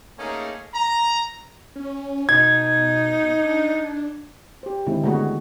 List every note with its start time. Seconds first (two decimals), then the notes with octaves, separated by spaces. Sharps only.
0.19 A3 A#3 C#4 D#4 G#4
0.74 A#5
1.76 C#4
2.29 B2 D#4 G#6
3.42 D4
4.63 G4 C5
4.87 D3 D#3 G#3 C4 E4
5.04 D3 G#3 A3 B3 F#4 G#4